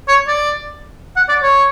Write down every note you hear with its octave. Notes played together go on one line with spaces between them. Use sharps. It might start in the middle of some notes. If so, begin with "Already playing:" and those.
C#5
D5
F#5
D5
C#5